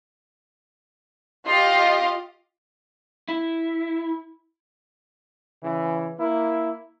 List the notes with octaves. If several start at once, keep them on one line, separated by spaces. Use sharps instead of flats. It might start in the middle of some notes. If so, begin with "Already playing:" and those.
F4 G4 D#5
E4
C#3 E3
A#3 E4